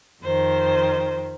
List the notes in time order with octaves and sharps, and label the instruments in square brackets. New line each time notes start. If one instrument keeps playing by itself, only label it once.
[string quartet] F2 D#3 C5